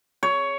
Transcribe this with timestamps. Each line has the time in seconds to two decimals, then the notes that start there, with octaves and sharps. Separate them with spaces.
0.23 C#5